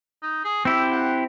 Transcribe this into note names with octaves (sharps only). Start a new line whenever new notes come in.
D#4
G#4
C4 E4 G4 E6
F#5